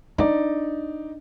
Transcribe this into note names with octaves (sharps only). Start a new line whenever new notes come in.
D4 D#4 D5